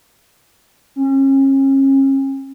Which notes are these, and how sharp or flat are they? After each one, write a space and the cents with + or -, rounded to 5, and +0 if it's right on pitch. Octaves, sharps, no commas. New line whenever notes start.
C#4 -35